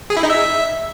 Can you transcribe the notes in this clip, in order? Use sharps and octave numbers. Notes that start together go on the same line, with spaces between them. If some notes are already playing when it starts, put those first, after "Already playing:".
G#4
E4
D#4
E5